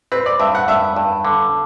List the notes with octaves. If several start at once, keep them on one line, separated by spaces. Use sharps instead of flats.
C4 B4
D5
G2 E5
F#5
G2 E5
G2
D3